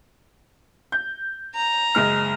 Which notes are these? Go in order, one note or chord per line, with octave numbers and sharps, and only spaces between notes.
G6
A#5
F#1 G#3 F6